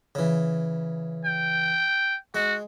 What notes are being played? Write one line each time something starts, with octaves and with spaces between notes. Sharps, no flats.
C#3 E3
G5
G#3 F#4